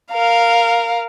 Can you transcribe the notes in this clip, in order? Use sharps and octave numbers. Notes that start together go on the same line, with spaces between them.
A#4 F5